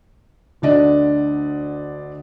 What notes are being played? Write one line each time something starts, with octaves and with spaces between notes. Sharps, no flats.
D2 D3 D5 D#5